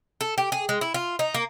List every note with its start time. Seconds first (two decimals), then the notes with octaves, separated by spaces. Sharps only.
0.21 A4
0.38 G4
0.52 G#4
0.69 G#3
0.81 E4
0.94 F4
1.19 D#4
1.34 A#3